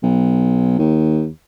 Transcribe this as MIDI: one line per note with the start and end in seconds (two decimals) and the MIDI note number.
0.03 0.74 35
0.79 1.28 39